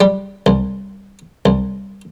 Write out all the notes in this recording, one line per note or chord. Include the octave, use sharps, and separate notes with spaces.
G3
C2
C2